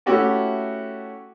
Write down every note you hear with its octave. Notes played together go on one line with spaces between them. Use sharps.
A3 C#4 E4 F#4 G4 A4